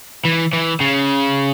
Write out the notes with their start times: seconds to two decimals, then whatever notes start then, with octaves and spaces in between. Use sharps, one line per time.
0.25 E3
0.53 E3
0.80 C#3